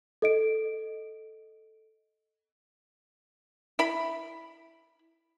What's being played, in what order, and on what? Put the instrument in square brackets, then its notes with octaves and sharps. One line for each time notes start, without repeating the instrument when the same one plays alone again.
[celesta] A4 D#5 D7
[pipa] E4 B5